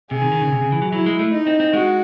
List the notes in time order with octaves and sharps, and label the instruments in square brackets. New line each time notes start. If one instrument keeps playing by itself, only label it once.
[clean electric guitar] C3 [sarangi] G#4
[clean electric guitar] D#3
D#3
C#3
C3
C#3
E3
F#3
[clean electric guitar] F#3 [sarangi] E4
[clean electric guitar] G#3
A3
[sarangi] D#4
[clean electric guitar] C4
C4
[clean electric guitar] G#3 [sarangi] F#4